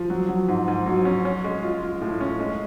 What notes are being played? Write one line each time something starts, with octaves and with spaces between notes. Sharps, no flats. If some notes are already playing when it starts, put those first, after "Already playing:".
Already playing: F3
F#3
F#3
G#2
G#2
F#3
C#4
C#4
G#3
F4
F4
A2
C#4
G#3